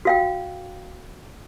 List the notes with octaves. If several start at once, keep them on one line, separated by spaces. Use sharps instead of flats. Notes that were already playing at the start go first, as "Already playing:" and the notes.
F#4 F5 G5